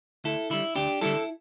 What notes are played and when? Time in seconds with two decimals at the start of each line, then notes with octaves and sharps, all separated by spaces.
0.24 D2 E4 A4
0.50 D3 G3 E4
0.75 D2 D4 G4
1.01 D3 G3 E4 A4